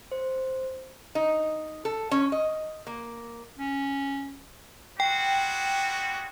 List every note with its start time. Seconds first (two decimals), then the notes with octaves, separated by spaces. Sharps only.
0.12 C5
1.15 D#4
1.85 A4
2.11 C#4
2.32 D#5
2.87 A#3
3.57 C#4
5.00 G3 G#3 F#4 G5